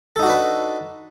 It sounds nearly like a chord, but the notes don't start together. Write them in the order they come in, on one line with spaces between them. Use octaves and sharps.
A4 D#4 F#4 D4 B4